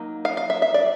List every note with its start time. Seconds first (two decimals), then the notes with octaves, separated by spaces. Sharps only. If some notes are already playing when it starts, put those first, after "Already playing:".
Already playing: F#3 A#3 D#4
0.25 F5
0.37 F5
0.50 E5
0.62 E5
0.74 D5